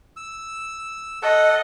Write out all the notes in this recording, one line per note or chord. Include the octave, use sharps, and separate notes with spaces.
E6
A4 D#5 F#5